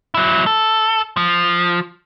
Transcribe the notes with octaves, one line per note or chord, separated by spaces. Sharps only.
F#3 E4
A4
F3